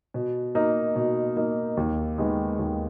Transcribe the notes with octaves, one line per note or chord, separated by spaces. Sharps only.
B2
A#3 D#4
B2
A#3 D#4
D#2
D#3 G#3 B3
D#2